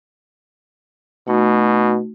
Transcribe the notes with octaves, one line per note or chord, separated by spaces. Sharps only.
B2 A3 D#4 F#4